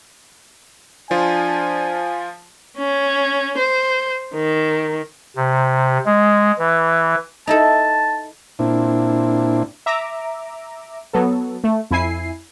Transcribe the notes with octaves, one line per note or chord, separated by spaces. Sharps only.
F3 D4 F4 G#5
C#4
C5
D#3
C3
G#3
E3
D#4 E4 A4 A5
A#2 C4 D4 E4
E5 A#5 D6
F#3 B3 A4
A3
F2 E4 G#5 C7